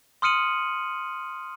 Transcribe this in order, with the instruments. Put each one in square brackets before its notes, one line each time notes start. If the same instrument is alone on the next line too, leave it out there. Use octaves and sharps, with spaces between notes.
[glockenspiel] C6 D#6 F6 C#7 D#7 F#7